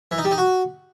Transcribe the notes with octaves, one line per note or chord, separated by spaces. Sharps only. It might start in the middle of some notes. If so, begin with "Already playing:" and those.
E3
D#4
G3
D#4
F#4